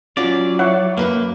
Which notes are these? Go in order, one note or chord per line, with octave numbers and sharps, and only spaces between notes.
F#3 C#4 F4 F#4 D5
E4 C#5 F#5
F#2 A#3 A#4 B4